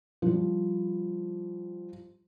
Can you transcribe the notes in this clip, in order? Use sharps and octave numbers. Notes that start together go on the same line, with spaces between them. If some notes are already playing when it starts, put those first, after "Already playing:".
F3 G3